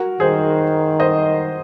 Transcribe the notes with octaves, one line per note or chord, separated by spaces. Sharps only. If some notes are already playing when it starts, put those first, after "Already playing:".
Already playing: F#4 A#4
D#3 G#4 C5
C5 D#5